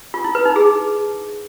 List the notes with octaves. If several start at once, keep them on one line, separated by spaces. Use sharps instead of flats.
F4
E4
B4
D#4
G#4